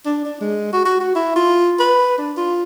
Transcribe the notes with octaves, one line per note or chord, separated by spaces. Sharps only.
D4
D4
G#3
F#4
F#4
F#4
E4
F4
B4
D4
F4